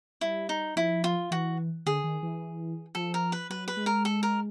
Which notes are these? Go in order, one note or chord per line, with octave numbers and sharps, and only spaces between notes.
G3 E4
D#4
F3 E4
F4
E3 F#4
D3 G#4
D#3
E3
F3 A4
A#4
B4
F#3 B4
B4
G#3
A#4
A4
A#4